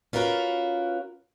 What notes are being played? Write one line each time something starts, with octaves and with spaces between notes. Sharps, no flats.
C#4 F4 F#4 A#4 B4